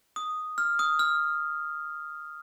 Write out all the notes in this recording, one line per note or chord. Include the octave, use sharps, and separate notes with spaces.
D#6
F6
D#6
F6